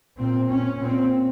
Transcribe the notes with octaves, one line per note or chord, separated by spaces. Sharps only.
A#2 C4
C#4
A#2 C4